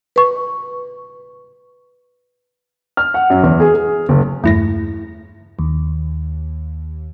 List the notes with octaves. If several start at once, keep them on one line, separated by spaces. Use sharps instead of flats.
B4 C#6
F6
F#5
F#2
E2
G#4
G#4
F#1
E2 G2 A3 E4 A#6
D#2